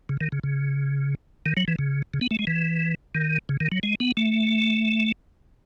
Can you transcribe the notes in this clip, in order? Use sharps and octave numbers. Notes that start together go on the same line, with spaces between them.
C#3
D#3
C#3
C#3
D#3
F#3
E3
C#3
C#3
B3
A3
G#3
E3
D#3
C#3
D#3
F#3
G#3
B3
A3